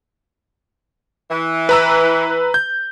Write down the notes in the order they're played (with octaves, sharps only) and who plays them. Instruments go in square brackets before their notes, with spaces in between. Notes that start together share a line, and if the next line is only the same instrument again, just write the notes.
[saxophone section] E3
[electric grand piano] B4 A#5 E6
G6